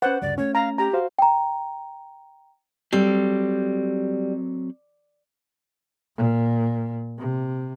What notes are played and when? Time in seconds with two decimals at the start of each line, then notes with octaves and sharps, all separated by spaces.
0.02 C#4 B4 C5 F#5
0.22 D2 G2 C#3 D5
0.38 A3 C#4 C#5
0.55 F5 A#5
0.78 G4 A#5
0.93 F#4 C5 F5
1.19 G5 A#5
2.93 F#3 G3 C4 A4
6.16 A#2
7.18 C3